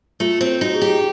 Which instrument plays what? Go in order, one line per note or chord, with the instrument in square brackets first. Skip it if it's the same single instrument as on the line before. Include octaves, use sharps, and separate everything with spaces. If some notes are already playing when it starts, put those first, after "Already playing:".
[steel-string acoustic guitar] A3 [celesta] F4
[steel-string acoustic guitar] C4
[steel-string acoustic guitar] D#4 [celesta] F#4
[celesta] G#4
[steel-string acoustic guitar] G4
[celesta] G#4